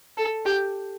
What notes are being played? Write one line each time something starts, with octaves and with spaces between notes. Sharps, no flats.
A4
G4